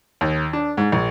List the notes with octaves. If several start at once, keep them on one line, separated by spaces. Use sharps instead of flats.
D#2
D4
G#2
A#1